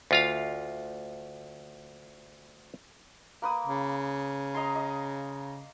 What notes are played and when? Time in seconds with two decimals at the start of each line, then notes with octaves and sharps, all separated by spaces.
0.11 D2 F4 F5
3.42 A#3 B4 D#6
3.67 C#3
4.54 D#5 A#5 C6
4.76 D#5